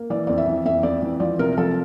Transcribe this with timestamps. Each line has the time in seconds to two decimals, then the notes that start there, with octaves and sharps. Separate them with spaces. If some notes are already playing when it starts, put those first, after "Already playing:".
Already playing: A#3
0.10 E3 D5
0.27 F2 D5
0.38 E5
0.48 E3
0.65 F2 E5
0.83 F2 D5
1.02 E3
1.20 F3 D5
1.39 C3 A#4
1.57 F3 A4